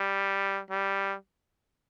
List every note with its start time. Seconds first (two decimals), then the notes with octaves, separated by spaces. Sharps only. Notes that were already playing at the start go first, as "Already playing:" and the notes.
Already playing: G3
0.71 G3